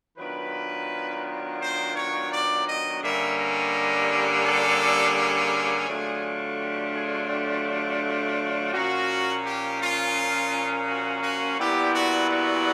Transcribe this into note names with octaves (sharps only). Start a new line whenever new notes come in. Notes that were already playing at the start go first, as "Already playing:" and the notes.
D#3 F#3 B3 D4 F4 B4
C5
C#5
D5
D#5
G2 D3 G3 A#3 C#4 E5
D#5
A4
G#4
D3 F#3 A3 D4 F4
G4
G#4
G4
A#2 F3 A#3 C#4 F#4
G4
F4
F#4
F#4
A#2 G3 B3 E4 G4
F#4
F#4